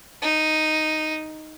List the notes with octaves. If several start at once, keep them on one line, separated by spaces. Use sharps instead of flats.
D#4